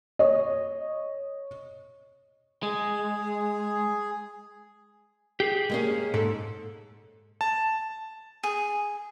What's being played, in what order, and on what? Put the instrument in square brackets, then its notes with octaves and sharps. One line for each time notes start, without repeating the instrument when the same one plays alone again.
[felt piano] C#5 D#5
[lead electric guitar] G#3 [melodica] G#4
[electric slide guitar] G4 G#4
[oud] G#3 A#3 C#4
[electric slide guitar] G#2 [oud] A4
[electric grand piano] A5
[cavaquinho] G#4